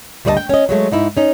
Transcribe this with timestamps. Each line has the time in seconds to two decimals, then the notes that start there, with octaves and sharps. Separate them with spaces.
0.25 D2 G3 C5 D5 D#5 A5
0.37 G5
0.49 C#4 D#5
0.69 F#3 G#3 A3
0.92 G#2 D#4 E4
1.17 C#4 D#4